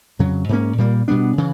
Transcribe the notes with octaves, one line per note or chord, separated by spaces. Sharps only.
F2 C#3 F#3
G#2 F3 A#3 C#4
A#2 G3 A#3
B2 G3 B3 D4
C#3 E3